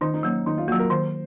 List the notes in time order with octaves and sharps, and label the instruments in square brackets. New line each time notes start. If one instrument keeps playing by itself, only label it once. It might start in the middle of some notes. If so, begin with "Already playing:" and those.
[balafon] D#3 [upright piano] D#4
[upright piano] D#4
[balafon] F#3 A#3 [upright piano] C#4
[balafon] D#3 [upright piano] D#4
[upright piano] F4
[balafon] F#3 A#3 [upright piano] F#4
[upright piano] A#4
[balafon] D#3 [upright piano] C5